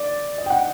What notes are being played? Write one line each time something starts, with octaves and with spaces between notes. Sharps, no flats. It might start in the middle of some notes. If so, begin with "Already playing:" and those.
Already playing: D5
D#5
G5
F#5